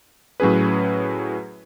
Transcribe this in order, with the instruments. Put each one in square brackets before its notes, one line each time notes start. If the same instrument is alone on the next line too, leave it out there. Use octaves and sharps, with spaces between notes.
[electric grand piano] A2 F#3 C#4 G#4 B4